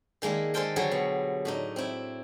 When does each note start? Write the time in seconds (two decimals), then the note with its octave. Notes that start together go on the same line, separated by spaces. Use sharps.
0.22 D#3 G#3 A#3 D4 E4
0.54 G#3 A4 C5 F5 G5 A5
0.76 D3 F#3 G3 G#4 C#5 A5
0.91 B2
1.45 A2 D4 D#4
1.76 C4 E4